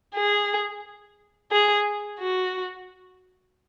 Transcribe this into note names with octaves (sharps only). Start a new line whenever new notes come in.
G#4
G#4
F#4